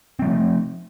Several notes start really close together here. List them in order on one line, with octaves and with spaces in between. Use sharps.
C4 G3 F3 A3